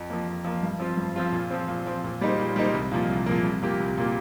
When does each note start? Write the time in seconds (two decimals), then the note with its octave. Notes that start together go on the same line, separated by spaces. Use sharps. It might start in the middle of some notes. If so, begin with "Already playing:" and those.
Already playing: F2
0.10 F3 A#3
0.28 F2
0.44 F3 A#3
0.63 G2
0.79 F3 C4 F4
0.97 G2
1.16 F3 C4 F4
1.32 A#2
1.50 F3 C4
1.68 A#2
1.86 F3 C4
2.04 A#2
2.21 G3 A#3 D#4 C5
2.39 A#2
2.56 G3 A#3 D#4 C5
2.74 C2
2.91 A#2 F3 A#3
3.09 C2
3.26 A#2 F3 A#3
3.44 C2
3.62 A#2 A#3 G4
3.80 C2
3.98 A#2 A#3 G4